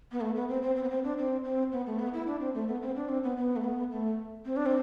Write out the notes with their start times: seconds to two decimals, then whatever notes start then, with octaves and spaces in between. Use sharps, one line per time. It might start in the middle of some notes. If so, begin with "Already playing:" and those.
0.12 B3
0.21 A3
0.35 B3
0.49 C4
0.62 C4
0.76 C4
0.83 B3
0.90 C4
1.04 D4
1.18 C4
1.44 C4
1.72 B3
1.86 A3
1.99 B3
2.13 E4
2.27 D4
2.40 C4
2.55 A3
2.68 B3
2.82 C4
2.96 D4
3.09 C4
3.23 B3
3.37 B3
3.56 A3
3.64 B3
3.92 A3
4.46 C4
4.56 D4
4.66 C4